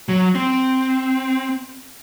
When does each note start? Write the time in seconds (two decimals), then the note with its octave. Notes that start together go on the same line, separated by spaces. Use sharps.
0.09 F#3
0.35 C4